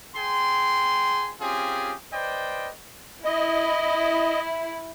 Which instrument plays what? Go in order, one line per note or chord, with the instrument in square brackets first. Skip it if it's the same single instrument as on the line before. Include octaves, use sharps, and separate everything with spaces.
[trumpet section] G#4 G5 C6
C4 C#4 F4 G4 G#4
B4 C5 D5 D#5 G5
[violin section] E4 [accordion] D#5